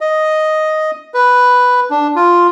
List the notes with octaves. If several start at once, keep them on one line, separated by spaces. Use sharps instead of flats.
D#5
B4
D4
F4